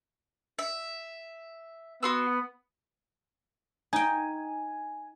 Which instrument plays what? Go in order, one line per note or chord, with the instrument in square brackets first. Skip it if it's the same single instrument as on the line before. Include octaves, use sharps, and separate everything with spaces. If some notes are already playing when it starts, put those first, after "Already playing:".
[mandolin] E5
[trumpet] B3 [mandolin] F#4 C6 E6
[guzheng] D#4 G5 [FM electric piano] G#5